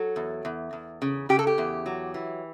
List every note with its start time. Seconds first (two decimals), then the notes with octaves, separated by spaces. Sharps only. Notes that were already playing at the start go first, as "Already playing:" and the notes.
Already playing: F#3 A4
0.16 E2
0.45 E2
0.73 E2
1.02 C#3
1.29 C#3 G4
1.39 A4
1.47 G4
1.58 E2
1.86 F#3
2.14 E3